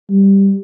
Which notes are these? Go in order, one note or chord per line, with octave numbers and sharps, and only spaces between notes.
G3